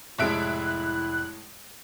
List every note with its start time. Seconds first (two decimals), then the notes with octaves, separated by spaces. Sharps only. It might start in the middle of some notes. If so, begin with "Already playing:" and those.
0.19 F1 A2 G#3 E4 E5 F#6 D7